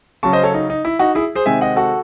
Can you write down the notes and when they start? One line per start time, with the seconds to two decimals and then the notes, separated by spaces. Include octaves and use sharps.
0.23 C#3 F#3 C#4 A5 C#6
0.33 C5 D#5
0.43 A4 C#5
0.54 D#4
0.70 D#4
0.85 E4
0.99 D#4 F#4
1.15 E4 G#4
1.35 G#4 C5
1.46 C3 D#3 G#3 C4 E5 G#5
1.61 D#5 F#5
1.76 F#4 A4